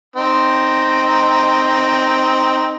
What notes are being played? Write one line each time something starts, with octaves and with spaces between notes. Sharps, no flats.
C4 D#4 G5